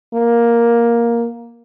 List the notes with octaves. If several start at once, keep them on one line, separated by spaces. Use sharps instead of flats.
A#3